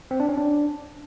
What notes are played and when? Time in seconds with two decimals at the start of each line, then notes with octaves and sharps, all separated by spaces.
0.11 C4
0.20 D4
0.29 C#4
0.38 D4